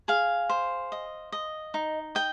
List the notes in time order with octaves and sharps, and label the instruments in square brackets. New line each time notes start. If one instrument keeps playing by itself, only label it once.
[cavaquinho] G#4 F5
C5
D#5
D#5
D#4
D#5 G5